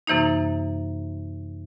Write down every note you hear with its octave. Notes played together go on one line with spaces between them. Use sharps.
F#2 C3 E3 A#3 D#4